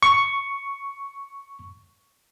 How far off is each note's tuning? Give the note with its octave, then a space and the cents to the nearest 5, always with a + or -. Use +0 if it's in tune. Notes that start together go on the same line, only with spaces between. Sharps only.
C#6 +5